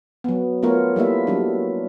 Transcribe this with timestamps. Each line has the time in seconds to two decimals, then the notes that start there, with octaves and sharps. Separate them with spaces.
0.24 F#3 B3
0.63 A3 B3 F4 A#4 C#5
0.96 G3 A#3 E4 E5
1.27 F#3 G3 D4